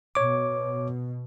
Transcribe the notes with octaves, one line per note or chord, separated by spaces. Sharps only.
B2 C#5 D6